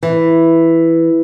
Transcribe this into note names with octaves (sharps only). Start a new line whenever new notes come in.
E3